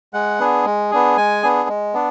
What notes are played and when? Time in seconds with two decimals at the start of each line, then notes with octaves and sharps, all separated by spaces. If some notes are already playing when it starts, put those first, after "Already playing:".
0.13 G#3 F#5
0.40 B3 D4 G#4
0.65 G#3
0.91 B3 D4 G#4
1.17 G#3 G#5
1.43 B3 D4 G#4
1.69 G#3
1.94 B3 D4